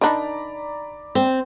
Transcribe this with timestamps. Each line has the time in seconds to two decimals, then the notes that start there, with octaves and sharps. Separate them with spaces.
0.01 D#3 D4 D#4 D5 A#5 B5
1.15 C4